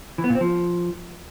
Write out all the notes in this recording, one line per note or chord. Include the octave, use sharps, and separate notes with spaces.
E3
B3
A#2
C4
F3